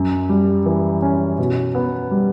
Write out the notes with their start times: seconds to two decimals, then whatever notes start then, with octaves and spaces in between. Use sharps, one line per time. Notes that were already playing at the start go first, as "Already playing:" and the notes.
Already playing: F#2
0.29 G3
0.66 E3
1.02 C#4
1.39 B2
1.75 B3
2.11 G3